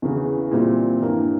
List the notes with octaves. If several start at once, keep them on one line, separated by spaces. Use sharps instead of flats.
E2 C#3 E3
A#2 G3 C4 E4
G2 E3 G3 A#3